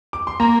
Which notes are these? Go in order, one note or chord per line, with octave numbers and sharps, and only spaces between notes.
D6
C6
A#3 A#5